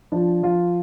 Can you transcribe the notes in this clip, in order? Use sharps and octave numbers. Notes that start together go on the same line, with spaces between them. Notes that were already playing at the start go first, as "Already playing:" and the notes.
F3 D4
F3 F4